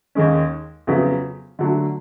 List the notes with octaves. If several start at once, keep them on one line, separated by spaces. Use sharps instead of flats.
D#2 D#3 G#3 C#4
F2 C#3 F#3 B3 E4
D3 F#3 A3